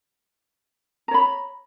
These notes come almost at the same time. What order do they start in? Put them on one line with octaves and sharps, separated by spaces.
A#5 C#5 B5